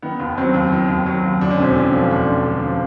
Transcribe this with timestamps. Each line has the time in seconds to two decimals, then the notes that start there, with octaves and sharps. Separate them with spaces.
0.02 D#3 B3
0.20 D#2
0.38 F#3 C4
0.54 D#2
0.72 D#3
0.89 D#2
1.06 F#3
1.24 D#2
1.41 D2 D4
1.51 C#4
1.59 E1 C4
1.71 D3 C#4
1.93 F3
2.10 D2 D4
2.28 E1
2.45 D3
2.62 F3